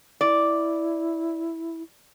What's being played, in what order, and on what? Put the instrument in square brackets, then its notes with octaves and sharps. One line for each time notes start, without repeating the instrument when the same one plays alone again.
[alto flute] E4 [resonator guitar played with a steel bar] D5